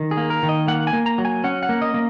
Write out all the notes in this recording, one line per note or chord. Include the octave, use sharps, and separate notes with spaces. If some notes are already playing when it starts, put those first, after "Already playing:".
Already playing: D#3
G#4
A#3
A#4
D#3
D#5
A#3 F#5
G#5
A#3
A#5
F#3
G#5
C#4 F#5
F#5
A#3
D#5
A#3